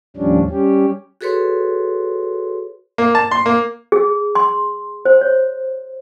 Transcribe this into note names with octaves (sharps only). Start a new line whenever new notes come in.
D#2 A2 F3 G3 C#4 D4
G3 C#4 G4
F#4 G#4 A4 B4 C#5 C6
A#3
A5
C6
A#3
G#4
C6
C5
C#5